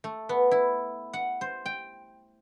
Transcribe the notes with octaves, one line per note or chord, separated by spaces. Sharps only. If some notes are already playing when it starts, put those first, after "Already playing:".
A3
B3
E4
F#5
C5
G5